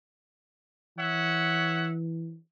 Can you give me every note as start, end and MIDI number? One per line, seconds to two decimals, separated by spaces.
0.97 2.37 52
0.97 1.90 73
0.97 1.90 76
0.97 1.90 78